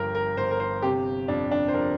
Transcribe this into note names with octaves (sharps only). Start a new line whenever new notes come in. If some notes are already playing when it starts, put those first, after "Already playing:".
Already playing: G1 G2 F3 A#4 G5
A#4
G1 C5
A#4
C5
C3 G4
F2 D4
D4
C5
F3 A#4